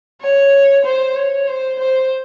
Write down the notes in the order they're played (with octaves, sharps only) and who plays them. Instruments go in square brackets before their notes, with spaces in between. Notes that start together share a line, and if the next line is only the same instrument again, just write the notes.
[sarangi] C#5
C5
C#5
C5
C5